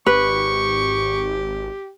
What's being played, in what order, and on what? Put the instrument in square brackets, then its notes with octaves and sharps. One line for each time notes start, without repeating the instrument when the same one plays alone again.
[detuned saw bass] G#1 [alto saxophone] G4 [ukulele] B4 [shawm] C#6